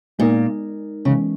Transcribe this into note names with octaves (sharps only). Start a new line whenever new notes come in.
A#2 G#3 D#4 A#4
C#3 E3 G#3 C#4